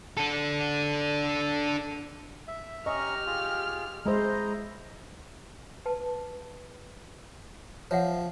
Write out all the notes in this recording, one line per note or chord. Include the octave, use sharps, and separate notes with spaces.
D4 A4
E5
C#4 G4 D#5 A#5 C#6 F6
F4 G#4
G#3 E4 C5 D#5 A#5
B4 A5
F3 C#5 E5 F#5